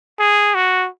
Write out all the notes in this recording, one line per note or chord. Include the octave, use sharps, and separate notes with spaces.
G#4
F#4